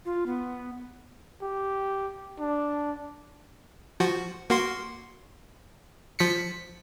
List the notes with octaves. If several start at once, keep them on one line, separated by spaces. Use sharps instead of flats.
F4
B3
G4
D4
F3 F#4
A#3 F#4 C6
F3 B6 C#7